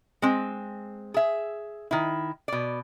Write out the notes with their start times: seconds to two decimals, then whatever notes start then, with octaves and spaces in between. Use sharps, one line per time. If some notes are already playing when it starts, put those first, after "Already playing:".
0.22 G#3 C4
1.14 G#4 E5
1.91 D#3 E4
2.48 B2 D5